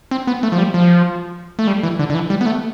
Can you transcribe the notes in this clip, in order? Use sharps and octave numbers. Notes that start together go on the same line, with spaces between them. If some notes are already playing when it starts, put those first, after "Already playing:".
C4
B3
A3
F3
G3
F3
A3
G3
E3
D3
D3
E3
G3
B3
A3